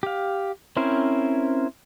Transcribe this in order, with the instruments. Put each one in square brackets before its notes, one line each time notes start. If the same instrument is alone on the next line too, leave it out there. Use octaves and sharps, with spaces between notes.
[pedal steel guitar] G4 F5
C4 C#4 E4 A#4 C5